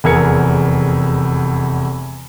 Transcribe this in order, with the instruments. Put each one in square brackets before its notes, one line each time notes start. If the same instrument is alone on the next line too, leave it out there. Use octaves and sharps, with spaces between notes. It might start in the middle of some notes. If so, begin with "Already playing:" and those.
[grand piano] F1 E2 G#4 A#4 G#6 C#7